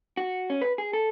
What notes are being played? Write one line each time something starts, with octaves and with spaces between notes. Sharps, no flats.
F#4
C#4
B4
G#4
A4